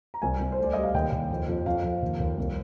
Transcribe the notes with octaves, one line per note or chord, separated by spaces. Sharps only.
A#5
C2 G#5
C2
C5
D2 D5
G3 D#5
F5
D#2 G5
D#2
F2
F2
F2 F5
F2
D#2
D#2
C2